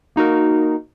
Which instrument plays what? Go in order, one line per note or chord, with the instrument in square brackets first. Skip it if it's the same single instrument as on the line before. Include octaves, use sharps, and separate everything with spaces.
[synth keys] A#3 D#4 F#4 A#4